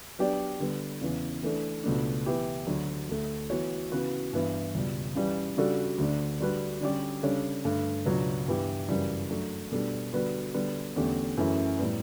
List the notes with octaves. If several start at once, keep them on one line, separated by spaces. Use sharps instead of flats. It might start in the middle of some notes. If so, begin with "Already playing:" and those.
F#3 B3 D4 G4 D5
D3 G3 B3
E2 C#3 E3
E3 A3 D4 A4
C#2 B2 A3 D4
E3 B3 E4 G4
D2 D3 F#3
D2 D3 A3
E3 B3 F#4 C#5
C#3 E3 B3 F#4 B4
G2 E3 B3 E4
C#2 B2 G3
C#3 E3 G3
C#3 G3 D4 F#4 A4
D2 D3 A3 D4
D3 G3 D4 F#4 B4
D3 G3 C#4 G4 D5
C#3 G3 D4 A4 C#5
G2 D3 A3
C#2 B2 F#3 B3 D4
G2 E3 B3 E4 G4
F#2 C#3 E3 G3
F#3 A3 D4
B2 G3 D4 A4
D3 G3 B3 F#4 B4
D3 G3 B3
E2 D3 A3 C#4 G4
F#2 E3 A3 C#4 E4
A2 G3 B3